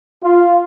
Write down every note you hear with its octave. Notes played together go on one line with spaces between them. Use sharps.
F4